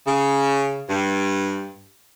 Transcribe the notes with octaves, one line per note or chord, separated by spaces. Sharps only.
C#3
G2